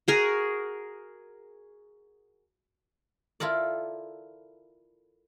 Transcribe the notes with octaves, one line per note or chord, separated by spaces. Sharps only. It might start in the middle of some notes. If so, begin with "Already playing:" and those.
F#4 G#4 A#4
E4 F4 A4 A#4 D5